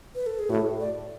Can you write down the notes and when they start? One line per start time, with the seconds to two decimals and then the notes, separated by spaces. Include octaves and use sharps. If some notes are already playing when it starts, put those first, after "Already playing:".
0.15 B4
0.26 A4
0.39 G#4
0.50 A2 F#4
0.80 D5